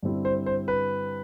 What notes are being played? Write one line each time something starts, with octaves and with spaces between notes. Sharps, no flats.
G2 D3 G3 C4 E4
C5
C5
B4